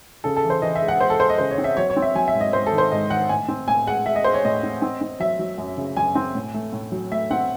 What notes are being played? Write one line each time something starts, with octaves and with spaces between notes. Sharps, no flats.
C#3 A4
A4
E3
C5
E3 D#5
E5
G#3
F#5
G#3 C5
A4
G#3 C5
D#5
C#3 C5
C#5
C4
E5
F#3 C#5
C#5
C4
E5
F#3 G#5
E5
G#2
D#5
G#2 C5
A4
D#3
C5
G#2 D#5
D#3 F#5
A2 G#5
C4
A2 G#5
G#3 F#5
G#3 E5
D#5
G#3 C5
C#5
A2 D#5
C4
C4
C4
F#3 E5
F#3
F#2
C#3
F#2 G#5
C4
A2
A3
A2
F#3
A3 E5
C4 F#5